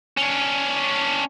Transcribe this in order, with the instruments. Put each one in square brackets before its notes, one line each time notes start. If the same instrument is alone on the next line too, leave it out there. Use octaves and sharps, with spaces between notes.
[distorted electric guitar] C#4 D4